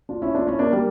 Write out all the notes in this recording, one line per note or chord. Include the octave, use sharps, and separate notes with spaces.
D4 F4
C#4 E4
D4 F4
C#4 E4
A#3 D4
G3 A#3